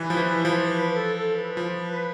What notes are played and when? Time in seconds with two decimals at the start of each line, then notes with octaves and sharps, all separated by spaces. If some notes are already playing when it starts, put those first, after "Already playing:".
Already playing: E3 G3 B4
0.10 F3
0.17 E3
0.45 F3
0.73 B4
0.93 A4
1.15 A4
1.36 B4
1.57 F3